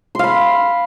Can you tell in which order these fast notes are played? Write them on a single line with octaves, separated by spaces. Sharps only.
C6 F5 B5